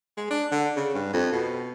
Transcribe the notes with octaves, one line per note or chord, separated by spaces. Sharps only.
G#3
D4
D3
C#3
G2
F2
B2